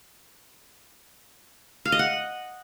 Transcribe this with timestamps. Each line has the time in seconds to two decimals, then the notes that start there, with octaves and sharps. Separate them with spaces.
1.85 F5
1.92 D#5
1.99 F#5